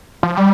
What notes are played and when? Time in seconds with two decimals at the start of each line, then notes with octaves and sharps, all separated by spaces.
0.23 F3
0.37 G3